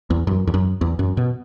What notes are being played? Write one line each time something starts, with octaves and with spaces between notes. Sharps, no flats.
E2
F#2
E2
F#2
E2
F#2
B2